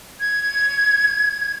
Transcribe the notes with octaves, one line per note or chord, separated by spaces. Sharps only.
G#6